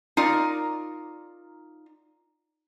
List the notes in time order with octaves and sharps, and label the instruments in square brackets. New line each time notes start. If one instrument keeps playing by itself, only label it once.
[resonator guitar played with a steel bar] D#4 F4 A#4 D5